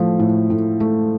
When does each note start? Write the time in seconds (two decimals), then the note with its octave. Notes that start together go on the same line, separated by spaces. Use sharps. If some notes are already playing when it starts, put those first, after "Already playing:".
Already playing: A2 F3 A3
0.19 A2
0.50 A2
0.80 A3